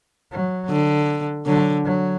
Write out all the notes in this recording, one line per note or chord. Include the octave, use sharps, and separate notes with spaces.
F#3
D3
D3 F#3
F#3